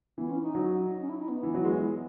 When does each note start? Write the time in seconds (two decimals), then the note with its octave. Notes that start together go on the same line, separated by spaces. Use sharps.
0.18 E3 B3
0.30 C#4
0.42 D#4
0.55 F#3
0.90 D#4
1.01 C#4
1.09 E4
1.19 D#4
1.28 B3
1.43 E3
1.54 F#3
1.65 E3 G#3